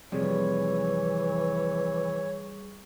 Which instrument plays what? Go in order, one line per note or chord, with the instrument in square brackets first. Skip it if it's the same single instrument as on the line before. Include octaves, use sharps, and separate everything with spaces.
[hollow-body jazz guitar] F2 C3 [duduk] E3 [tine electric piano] G3 G#4 [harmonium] C#5